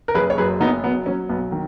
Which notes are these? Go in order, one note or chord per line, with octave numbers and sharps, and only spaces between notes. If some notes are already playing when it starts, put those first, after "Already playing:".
A#4
F#1 G#4 B4
C#5
F#2 G#4 B4
F#1 B3 D#4
F#3 B3
F#3 C#4
B1 B3
D#3